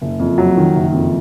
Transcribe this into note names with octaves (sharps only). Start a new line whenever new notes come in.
F#1
F2
F#3
D#3
F#1
F2